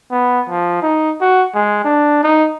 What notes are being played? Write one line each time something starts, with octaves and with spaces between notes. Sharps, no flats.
B3
F3
D#4
F#4
G#3
D4
D#4